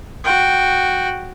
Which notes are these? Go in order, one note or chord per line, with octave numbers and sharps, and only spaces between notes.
F#4 G5